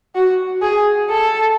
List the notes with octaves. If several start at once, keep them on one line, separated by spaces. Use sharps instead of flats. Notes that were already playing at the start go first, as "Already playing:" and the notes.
F#4
G#4
A4